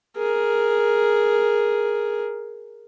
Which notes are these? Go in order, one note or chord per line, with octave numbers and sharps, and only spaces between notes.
G#4 A#4